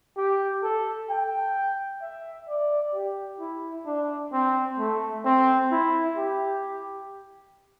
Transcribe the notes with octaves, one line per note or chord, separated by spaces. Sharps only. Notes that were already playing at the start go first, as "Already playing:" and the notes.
G4
A4
G5
E5
D5
G4
E4
D4
C4
A3
C4
E4
G4